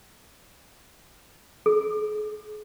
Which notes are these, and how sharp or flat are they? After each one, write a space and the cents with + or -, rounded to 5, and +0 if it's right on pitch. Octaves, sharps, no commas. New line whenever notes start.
G#4 +40